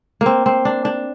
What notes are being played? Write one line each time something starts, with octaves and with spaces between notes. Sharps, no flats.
A#3 C4
C4
D4
D4